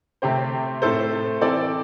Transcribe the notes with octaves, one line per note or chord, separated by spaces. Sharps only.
C3 A3 C4 G4 C5
A2 A3 C4 A4 C5
E3 C4 A4 D5